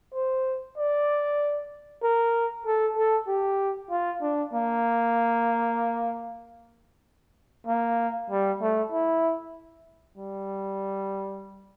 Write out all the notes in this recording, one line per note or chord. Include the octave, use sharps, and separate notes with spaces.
C5
D5
A#4
A4
A4
G4
F4
D4
A#3
A#3
G3
A3
E4
G3